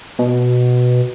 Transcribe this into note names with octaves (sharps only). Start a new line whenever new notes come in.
B2